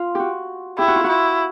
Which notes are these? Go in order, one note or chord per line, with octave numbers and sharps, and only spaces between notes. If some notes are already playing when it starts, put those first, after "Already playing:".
Already playing: F4
F#4 G4
E4 G4
F#4
F4
E4 F#4